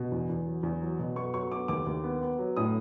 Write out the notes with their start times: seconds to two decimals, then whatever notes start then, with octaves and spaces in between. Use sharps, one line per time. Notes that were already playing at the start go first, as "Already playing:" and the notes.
Already playing: B2
0.12 E2
0.29 E2
0.46 F#3
0.63 E2
0.82 F#3
0.99 B2
1.16 B3 C#6
1.34 F#3 C#6
1.51 B3 D6
1.68 D#2 D6
1.87 D#2
2.04 B3
2.22 B3
2.39 F#3
2.56 A2 D#6